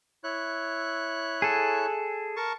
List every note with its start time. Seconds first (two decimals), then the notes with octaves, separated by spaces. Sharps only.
0.24 E4 C#5 F#6
1.42 G#4 A4
2.37 A#4 A5 C#6